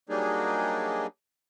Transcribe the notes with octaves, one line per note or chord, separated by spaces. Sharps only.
F#3 G3 A#3 D4 D#4 G#4